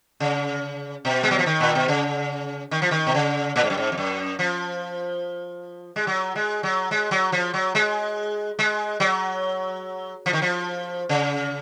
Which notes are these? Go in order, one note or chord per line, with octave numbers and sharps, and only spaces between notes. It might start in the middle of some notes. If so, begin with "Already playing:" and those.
C#3
B2
G#3
F#3
F3
D#3
A#2
B2
C#3
D#3
F3
D#3
B2
C#3
A#2
G#2
F#2
G#2
F2
F#2
F3
G#3
F#3
G#3
F#3
G#3
F#3
F3
F#3
G#3
G#3
F#3
F3
D#3
F3
C#3